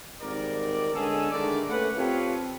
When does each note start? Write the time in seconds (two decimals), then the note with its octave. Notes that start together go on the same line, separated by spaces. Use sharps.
0.22 G#1 D#3 G3 A#4 D5
0.95 D3 G#3 B3 C#4 G#4 A4
1.32 D3 D#3 G#3 A3 A#4 D5
1.69 A3 A#3 C#4 B4 F#5
1.98 C4 F4 G4 A4 B4 C#5